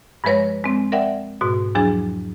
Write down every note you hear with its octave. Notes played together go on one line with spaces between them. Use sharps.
G2 F3 G#3 B4 C#5 A#6
G#3 C4
A#4 D5 E5 F#5 G5
G#2 B2 F#4
E2 F3 F#3 D4 G#4 A6